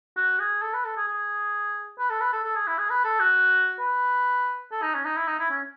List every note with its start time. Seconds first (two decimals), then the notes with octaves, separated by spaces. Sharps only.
0.17 F#4
0.40 G#4
0.62 A4
0.74 B4
0.85 A4
0.97 G#4
1.07 G#4
1.98 B4
2.10 A4
2.21 B4
2.33 A4
2.44 A4
2.56 G#4
2.67 E4
2.78 G#4
2.90 B4
3.04 A4
3.20 F#4
3.80 B4
4.71 A4
4.82 D#4
4.95 C#4
5.05 D#4
5.17 E4
5.28 D#4
5.39 E4
5.51 C#4